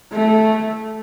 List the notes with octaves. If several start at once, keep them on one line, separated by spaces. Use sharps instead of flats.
A3